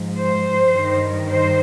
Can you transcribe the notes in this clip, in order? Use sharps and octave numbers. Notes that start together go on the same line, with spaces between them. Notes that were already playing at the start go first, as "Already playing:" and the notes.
Already playing: G#2 F3
C5
G2 D#3
C5